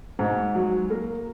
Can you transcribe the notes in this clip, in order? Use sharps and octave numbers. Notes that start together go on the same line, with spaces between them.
G#2
F#3
A#3